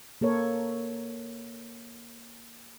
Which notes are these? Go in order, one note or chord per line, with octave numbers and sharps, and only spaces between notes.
A#3 A4 A#4 C#5